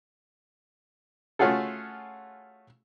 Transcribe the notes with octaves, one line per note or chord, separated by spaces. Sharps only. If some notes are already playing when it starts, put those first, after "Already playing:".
A3 C#4 F4 F#4 G#4 A4